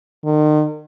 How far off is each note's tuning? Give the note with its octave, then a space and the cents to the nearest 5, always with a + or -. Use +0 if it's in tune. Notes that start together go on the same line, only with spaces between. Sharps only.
D#3 -40